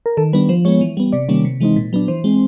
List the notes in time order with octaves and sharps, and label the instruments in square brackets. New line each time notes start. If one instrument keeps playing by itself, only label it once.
[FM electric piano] A#4
D#3 A4
G3 B3 D4 B4
F3 C5
G#3 B3 C#5
E3
G3 B3
C3 D5
D#3 G3 A#3 C#4
C3
E3 G#3 C4 D#4
A#2
F#3 B3 D4
E3 C5
G#3 C4